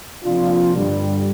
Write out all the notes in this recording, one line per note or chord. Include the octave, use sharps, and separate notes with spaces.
C3 F3 A#3 D4 F4
G2 D3 G3